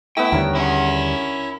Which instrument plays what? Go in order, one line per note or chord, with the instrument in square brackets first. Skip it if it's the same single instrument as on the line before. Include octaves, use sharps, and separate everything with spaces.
[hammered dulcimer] A3 B3 [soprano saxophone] E4 [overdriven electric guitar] G5
[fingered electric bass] D#2 D3 G3 [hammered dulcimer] A#4 C#5
[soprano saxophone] C#4 [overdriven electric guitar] E4 F#5